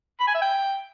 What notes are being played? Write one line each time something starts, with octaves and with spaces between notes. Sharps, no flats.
B5
G#5
E5
G5